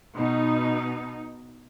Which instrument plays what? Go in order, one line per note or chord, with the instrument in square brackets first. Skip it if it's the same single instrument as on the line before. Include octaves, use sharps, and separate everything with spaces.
[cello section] B2 D#4